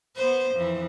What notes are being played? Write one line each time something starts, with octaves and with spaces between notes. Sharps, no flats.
B3 C5
F2 E3